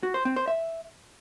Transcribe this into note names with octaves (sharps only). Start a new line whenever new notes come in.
F#4
C5
C4
C5
E5